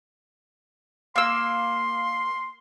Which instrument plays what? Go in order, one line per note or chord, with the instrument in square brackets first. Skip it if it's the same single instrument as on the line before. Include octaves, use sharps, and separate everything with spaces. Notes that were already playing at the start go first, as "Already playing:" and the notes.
[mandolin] A#3 E6 [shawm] C6